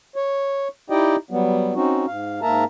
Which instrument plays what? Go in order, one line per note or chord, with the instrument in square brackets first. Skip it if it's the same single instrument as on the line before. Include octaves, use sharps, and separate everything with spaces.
[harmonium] C#5
D#4 E4 G4 D5 D#5 G5
F#3 G3 B3
C4 C#4 D#4 F#4
G#2 F5
G#2 A#3 A#4 E5 A5 A#5